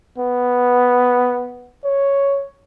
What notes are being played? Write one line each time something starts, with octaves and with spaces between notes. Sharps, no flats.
B3
C#5